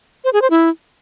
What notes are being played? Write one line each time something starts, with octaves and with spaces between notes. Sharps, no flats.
C5
G#4
C5
E4